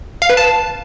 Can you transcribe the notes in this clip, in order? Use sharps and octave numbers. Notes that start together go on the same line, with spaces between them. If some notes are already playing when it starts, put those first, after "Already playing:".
F5
B4
A5